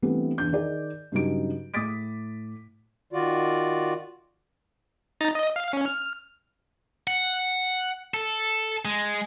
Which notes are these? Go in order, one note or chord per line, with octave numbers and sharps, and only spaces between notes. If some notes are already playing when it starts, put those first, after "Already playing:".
E3 G3 A3 B3 C4 D4
E2 D4 G6
D#3 G#4 D5
G2 C#3 F#3 G3 D#4 D7
A2 D6 D#6 A6 B6 D7
D#3 F4 F#4 D5
D#4 A#5 A6
D#5
F5
C#4
F6
F#5
A4
G#3